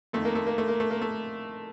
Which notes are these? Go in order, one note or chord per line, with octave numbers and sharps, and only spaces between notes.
F2 D#3 A3
A#3
A3
A#3
A3
A#3
A3
A#3
A3